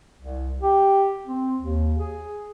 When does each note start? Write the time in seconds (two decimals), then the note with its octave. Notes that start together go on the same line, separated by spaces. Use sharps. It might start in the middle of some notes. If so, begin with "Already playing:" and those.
0.19 C2
0.61 G4
1.26 C4
1.58 D#2
1.98 G#4